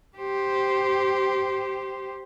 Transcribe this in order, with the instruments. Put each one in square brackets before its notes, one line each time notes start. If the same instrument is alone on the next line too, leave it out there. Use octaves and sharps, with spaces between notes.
[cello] G4 C5